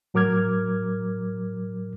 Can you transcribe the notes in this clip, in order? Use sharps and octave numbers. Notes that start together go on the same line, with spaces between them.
A2 F#3 A#4 D6 F6 G#6